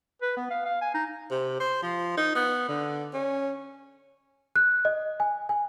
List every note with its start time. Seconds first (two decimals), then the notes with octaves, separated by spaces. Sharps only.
0.22 B4
0.37 B3
0.50 F5
0.65 F5
0.81 G#5
0.94 D#4
1.31 C3
1.60 C5
1.83 F3
2.17 D#4
2.35 B3
2.69 D3
3.14 C#4
4.56 F#6
4.85 D#5
5.20 G#5
5.49 G#5